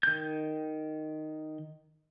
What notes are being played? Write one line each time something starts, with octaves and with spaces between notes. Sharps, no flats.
D#3 G6